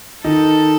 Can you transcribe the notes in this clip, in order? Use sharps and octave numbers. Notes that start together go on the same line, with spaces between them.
D#3 D#4 A4